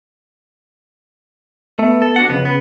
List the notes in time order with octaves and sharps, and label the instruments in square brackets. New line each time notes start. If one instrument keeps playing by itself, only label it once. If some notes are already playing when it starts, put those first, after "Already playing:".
[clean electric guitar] A3 [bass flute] B3
[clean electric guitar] A4
D4 F#4 F#5
[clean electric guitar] F2 B3 [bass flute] C#3
[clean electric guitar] B3